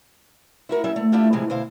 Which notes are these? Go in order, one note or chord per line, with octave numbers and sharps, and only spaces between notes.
E4 F#4 A#4
F#3 G3 C#4 E5
A3
A3 D4 E4 F4 G4
A2 C3 E3 F3 G#3
D2 B2 E4 C5 F5